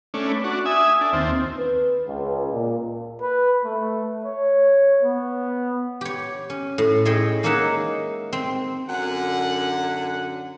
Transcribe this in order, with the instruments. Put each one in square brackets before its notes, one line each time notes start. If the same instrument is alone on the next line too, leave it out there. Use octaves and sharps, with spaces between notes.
[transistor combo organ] A3 C#4 D4
[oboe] B4
[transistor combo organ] D4 F#4 [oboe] C#6
[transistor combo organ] E5 G#5 [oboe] D#6
[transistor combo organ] D4 [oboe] A4
[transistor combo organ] D#2 C4 [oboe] F4
[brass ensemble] B4
C#2
A#2
[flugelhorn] B4
A3
C#5
B3
[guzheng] G4 C#5
C#4
A2
E4 G#4 C#5 D#5 G5
G#3 A#3 D#4 C#5 E5 F#5
C4
[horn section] F#2 D3 F#5